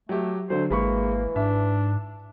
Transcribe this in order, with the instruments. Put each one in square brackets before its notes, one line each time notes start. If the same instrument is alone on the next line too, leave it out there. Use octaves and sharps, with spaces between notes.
[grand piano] F#3 G4 [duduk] A3
[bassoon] D2 [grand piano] D3 F#3 [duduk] C5
[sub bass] G#1 [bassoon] E3 [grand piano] G#3 B5 C#6 [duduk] A#3
[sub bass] G#2 [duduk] D4 [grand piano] E5